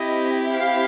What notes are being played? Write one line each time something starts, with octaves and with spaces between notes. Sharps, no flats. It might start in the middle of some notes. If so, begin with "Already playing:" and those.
Already playing: C4 E4 G4 D#5
F5